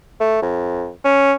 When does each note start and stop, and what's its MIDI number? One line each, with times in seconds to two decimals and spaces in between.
0.20 0.40 57
0.42 0.90 41
1.04 1.33 61